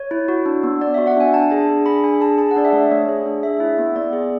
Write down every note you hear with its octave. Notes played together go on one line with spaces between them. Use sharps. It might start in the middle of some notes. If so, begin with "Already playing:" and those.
Already playing: C#5
E4
F#4
D4
B3
B3 D5
F#4 E5
F#5
D4 G#5
D4 A5
G#4
D4
G#4 B5
D4 G#5
G#4 A5
G#4 A5
F#5
D4 D5
E5
A3
A3 C#5
G#4
D4
G#4 E5
E4
B3
B3 D5
G#4